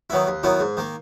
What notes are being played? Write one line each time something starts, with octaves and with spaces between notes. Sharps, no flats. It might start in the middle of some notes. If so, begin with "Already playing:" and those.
D#3 F#3 B3 E4
D#2
D#3 F#3 B3 E4
G#2
D#3 A#3